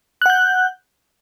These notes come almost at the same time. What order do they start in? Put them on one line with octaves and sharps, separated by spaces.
F#6 F#5 G6